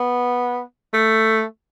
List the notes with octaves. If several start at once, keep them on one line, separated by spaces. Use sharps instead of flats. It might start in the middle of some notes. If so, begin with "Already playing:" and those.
Already playing: B3
A3